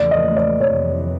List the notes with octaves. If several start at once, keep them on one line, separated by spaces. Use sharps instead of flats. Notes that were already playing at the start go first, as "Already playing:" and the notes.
Already playing: E2 C#3 F3 A3 D5
D#5
D5
F2 C3 E3 C#5